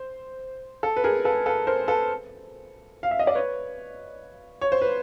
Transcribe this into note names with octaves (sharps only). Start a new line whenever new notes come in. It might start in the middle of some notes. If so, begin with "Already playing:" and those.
Already playing: C5
A4
B4
G#4 A#4
A4 B4
A4 B4
A#4 C5
A4 B4
F5
E5
D#5
D5
B4 C#5
C#5
C5
B4